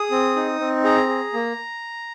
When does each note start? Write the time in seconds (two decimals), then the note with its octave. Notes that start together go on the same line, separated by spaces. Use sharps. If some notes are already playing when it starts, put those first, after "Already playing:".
Already playing: G#4 D#6
0.11 C4
0.36 D#4
0.60 C4
0.84 G#4 A#5
1.09 G#4
1.34 A#3